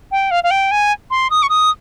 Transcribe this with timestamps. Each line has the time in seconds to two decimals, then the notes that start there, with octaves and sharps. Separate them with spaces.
0.11 G5
0.31 F5
0.44 F5
0.51 G5
0.71 G#5
1.11 C6
1.30 D#6
1.43 C#6
1.49 D#6